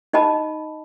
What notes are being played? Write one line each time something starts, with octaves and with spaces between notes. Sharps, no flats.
D#4 D#5 A5 B5